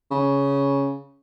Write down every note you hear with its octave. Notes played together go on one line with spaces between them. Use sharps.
C#3